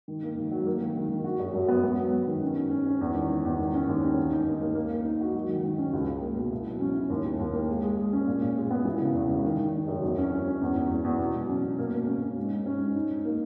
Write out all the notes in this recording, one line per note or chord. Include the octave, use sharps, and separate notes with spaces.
D#3
A#3
D#3
F#3
A#3
D#3
D#3
D#3
F#4
F#2
F#2
B3
B3
F#3
B3
D#3
C#4
C#4
C#4
C#4
E2
D#3
D#3
E2
D#3
C#4
D#2
C#4
D#3
D#4
D#2
A#3
A#3
A#3
D#4
F#4
F#3
D#3
D#3
C#4
C#2
C#2
A#3
B2
E4
F#3
C#4
E4
D#2
D#2
D#2
A#3
G#3
G#3
G#3
C#4
A#2
A#2
G#3
B3
E3
C#3
E2
C#3
D#3
D#3
D#3
F#2
E2
C#4
C#4
C#4
E2
E2
E2
E2
B2
F#3
C#4
B2
A#3
A#3
C#4
C#4
G#2
G#2
C#4
G#2
D#4
D#4
A#3